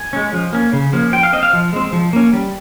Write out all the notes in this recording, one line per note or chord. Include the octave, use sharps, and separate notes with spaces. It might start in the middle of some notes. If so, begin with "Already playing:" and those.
Already playing: G#5
G#3 C#4
F3
A#3 C#4
C#3
F3 A#3 C#4
F3 G5
F5
C4 D#5
F5
F3
G#3 C4
F3
A#3 C#4
G3